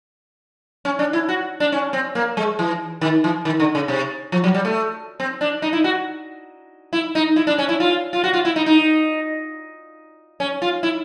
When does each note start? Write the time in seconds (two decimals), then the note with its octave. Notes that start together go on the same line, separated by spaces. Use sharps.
0.85 C#4
0.99 D4
1.13 E4
1.29 F#4
1.60 D4
1.72 C#4
1.93 C4
2.15 A#3
2.37 G#3
2.59 E3
3.01 D#3
3.24 E3
3.45 D#3
3.60 D3
3.75 C#3
3.88 C3
4.32 F3
4.44 F#3
4.54 G3
4.65 A3
5.20 C4
5.41 D4
5.62 D#4
5.73 E4
5.84 F#4
6.93 E4
7.15 D#4
7.36 E4
7.47 D4
7.58 C#4
7.69 E4
7.80 F4
8.13 F4
8.24 F#4
8.33 F4
8.45 E4
8.56 D#4
8.66 D#4
10.40 C#4
10.62 F4
10.83 E4